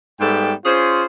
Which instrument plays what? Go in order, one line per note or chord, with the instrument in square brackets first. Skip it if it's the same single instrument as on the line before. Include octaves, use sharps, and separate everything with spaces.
[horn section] G#2 G3 B3 A4 E5 G5
C#4 F4 G#4 C5